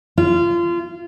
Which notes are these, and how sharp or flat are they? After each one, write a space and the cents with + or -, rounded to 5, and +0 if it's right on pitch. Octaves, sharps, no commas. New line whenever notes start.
F4 -25